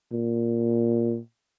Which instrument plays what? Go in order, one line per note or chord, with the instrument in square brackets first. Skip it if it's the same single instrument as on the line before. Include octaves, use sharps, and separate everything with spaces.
[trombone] A#2